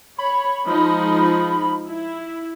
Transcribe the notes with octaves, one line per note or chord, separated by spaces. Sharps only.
C#5 B5
F3 G#3 D#4
E4